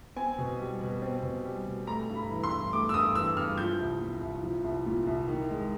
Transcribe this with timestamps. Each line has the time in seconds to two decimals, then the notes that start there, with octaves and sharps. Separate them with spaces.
0.16 C4 G#5
0.38 B2
0.59 G3
0.81 B2
1.02 C4
1.23 B2
1.45 G3
1.66 B2
1.87 A3 A#5
2.09 G2
2.16 B5
2.30 E3
2.44 C6
2.51 G2
2.72 A3 D6
2.89 E6
2.94 G2 D#6
3.15 E3 E6
3.36 G2 F6
3.57 F3 G6
3.79 C2
4.01 A#2
4.21 C2
4.43 F3
4.64 C2
4.86 A#2
5.07 C2
5.28 D#3
5.49 G#3